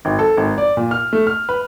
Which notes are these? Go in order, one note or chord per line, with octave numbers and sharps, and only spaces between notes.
G#1
A4
G#1
D5
A#2
F6
A3
F6
B4